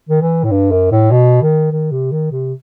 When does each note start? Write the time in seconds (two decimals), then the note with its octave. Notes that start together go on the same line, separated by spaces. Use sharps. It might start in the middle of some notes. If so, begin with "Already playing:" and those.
0.09 D#3
0.21 E3
0.44 A2
0.51 G2
0.71 F#2
0.91 A2
1.11 B2
1.42 D#3
1.71 D#3
1.91 C3
2.12 D#3
2.32 C3